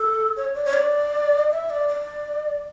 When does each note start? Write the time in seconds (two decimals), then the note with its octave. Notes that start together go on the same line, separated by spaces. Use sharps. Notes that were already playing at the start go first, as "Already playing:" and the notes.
Already playing: A4
0.36 C#5
0.55 D5
0.65 C#5
0.74 D5
1.51 E5
1.70 D5
1.88 D5